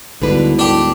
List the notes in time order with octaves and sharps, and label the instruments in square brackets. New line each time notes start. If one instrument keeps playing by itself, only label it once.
[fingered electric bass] D2 G#2 B2 [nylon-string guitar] D3 D4 B4 [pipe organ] G3 E4
[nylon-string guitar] A3 [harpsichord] D4 G4